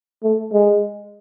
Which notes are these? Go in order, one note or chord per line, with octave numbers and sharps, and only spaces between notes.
A3
G#3